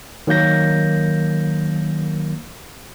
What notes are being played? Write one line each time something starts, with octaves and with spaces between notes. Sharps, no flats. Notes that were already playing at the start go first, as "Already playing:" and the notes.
D#3 F#3 A#3 G6 A#6